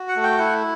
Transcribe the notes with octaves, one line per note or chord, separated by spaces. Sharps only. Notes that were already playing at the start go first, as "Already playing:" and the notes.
Already playing: F#4
F#5
A3
G5
E4 F#5